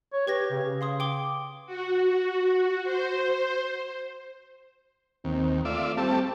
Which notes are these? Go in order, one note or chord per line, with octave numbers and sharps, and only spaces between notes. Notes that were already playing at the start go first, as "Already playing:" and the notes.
C#5
G4 B4 G#6 A#6
C#3
F5 C6 D#6
G5 D6 G7
F#4
C5
D#2 C4
A3 F4 D5 E5
G3 A3 C4 A5